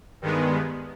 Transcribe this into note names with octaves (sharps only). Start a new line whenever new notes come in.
G2 D#3 G#3 B3